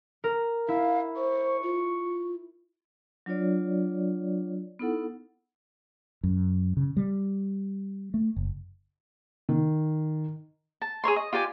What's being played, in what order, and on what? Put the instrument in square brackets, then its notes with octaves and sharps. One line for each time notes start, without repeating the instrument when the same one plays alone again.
[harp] A#4
[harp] E4 [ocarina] F5
[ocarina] C5 [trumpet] C#6
[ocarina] F4
[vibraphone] F#3 D4 F4 C#5 D5
B3 D#4 E4 A4 F#5
[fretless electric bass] F#2
C#3
G3
A3
F#1
[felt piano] D#3
[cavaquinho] A5
G#4 A#4 C#5 C6
D#5
F4 G4 D5 G#5